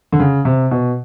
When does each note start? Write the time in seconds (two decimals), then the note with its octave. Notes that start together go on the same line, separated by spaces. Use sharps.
0.12 D3
0.20 C#3
0.45 C3
0.71 B2